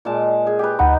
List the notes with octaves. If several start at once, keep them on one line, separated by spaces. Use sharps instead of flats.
A#2 G#3 A5
G#4
G4 B4
D2 D#4 F#5 B5